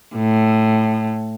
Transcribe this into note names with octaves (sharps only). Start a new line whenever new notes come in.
A2